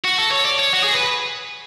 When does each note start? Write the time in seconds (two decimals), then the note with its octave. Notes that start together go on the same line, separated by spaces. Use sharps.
0.05 F#4
0.18 A4
0.32 C#5
0.45 D5
0.59 C#5
0.73 F#4
0.83 G#4
0.93 B4